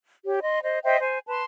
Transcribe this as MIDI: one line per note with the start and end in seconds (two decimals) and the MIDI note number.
0.25 0.41 67
0.25 0.41 73
0.42 0.59 75
0.42 0.59 84
0.63 0.79 72
0.63 0.79 75
0.84 0.97 72
0.84 0.97 75
0.84 0.97 76
0.84 0.97 79
1.00 1.19 72
1.00 1.19 80
1.28 1.43 71
1.28 1.43 81
1.28 1.43 84